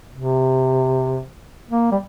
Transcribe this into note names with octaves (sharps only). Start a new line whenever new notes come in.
C3
A#3
G3